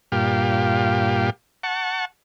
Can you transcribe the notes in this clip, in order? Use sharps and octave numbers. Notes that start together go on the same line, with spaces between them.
G2 A#2 F4 G4
F#5 A5 C#6